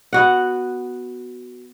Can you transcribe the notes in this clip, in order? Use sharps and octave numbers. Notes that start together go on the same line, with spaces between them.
B3 F#4 F#5